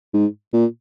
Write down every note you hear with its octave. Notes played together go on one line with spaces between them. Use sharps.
G#2
A#2